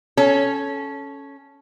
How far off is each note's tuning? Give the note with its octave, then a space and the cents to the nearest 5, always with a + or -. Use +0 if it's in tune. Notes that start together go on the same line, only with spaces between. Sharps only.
C#4 +0 A4 -15